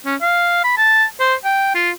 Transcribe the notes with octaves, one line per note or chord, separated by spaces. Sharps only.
C#4
F5
B5
A5
C5
G5
F4